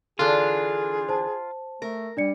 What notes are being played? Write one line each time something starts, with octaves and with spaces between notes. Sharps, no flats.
D3 E3 D4 F4 G#4 A4
C5 A5
A3 A#4
G3 D4 D5 C#7